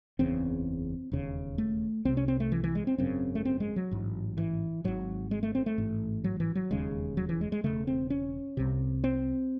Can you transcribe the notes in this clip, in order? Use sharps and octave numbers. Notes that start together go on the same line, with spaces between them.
F#1 E2 C#3 C4
E1 D#2 C#3
A3
C2 C3 C4
C#4
C4
A3
E3
E3
G#3
C4
G#1 F#2 C#3 C4
A3
C4
G#3
F#3
A1 G#2
E3
G#1 G#2 F#3
G#3
A3
C4
A3
A1 G#2
F#3
E3
F#3
E1 D#2 C#3 G#3
F#3
E3
G#3
G#3
E1 D#2 C#3 A3
C4
C#4
C2 C3
C4